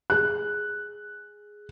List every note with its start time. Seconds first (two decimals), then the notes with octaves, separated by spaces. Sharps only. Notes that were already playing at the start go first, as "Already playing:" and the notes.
0.10 G#4 F#6